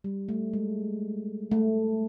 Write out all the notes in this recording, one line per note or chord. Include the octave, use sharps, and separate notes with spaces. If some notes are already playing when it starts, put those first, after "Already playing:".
G3
A3
G#3
A3